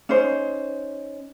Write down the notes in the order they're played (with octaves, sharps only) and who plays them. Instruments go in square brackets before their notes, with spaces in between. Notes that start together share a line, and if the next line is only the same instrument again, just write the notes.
[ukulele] C#4 D#4 C5